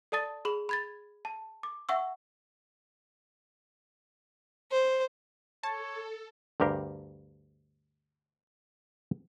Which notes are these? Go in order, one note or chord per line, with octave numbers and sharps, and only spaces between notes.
A4 D5 A5 D#6 A6
G#4 B5 F#7
B5 G#6 A6
A5
D6
E5 F#5 C#6 E6
C5
A4 C#5 A5
D2 G2 G4 A#4 F5